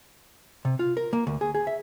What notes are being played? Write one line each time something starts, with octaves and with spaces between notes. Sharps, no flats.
C3
F4
A#4
A#3
D2
G#4
G#4
E5